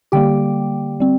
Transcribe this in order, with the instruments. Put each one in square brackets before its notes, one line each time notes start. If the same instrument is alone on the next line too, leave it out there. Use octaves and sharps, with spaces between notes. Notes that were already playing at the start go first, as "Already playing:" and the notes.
[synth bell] D3 G3 A#3 G4 G5
G3 C4